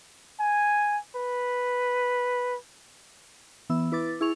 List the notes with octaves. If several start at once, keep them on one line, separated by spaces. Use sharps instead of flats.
G#5
B4
E3 B3 E6
E4 B4 D6 A6
E4 G#4 C#6 F7